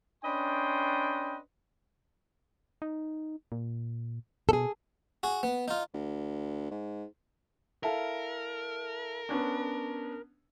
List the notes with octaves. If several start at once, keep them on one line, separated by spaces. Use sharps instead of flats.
C#4 D4 B4 D#5 G5 C6
D#4
A#2
B2 G#4 A4
F#4 G#4
B3
D#4 F4
D2
G#2
E4 A4 A#4 F5
B3 C#4 D4